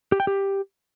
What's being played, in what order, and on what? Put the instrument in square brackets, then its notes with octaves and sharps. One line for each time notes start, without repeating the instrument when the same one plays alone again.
[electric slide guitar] G4
G5
G4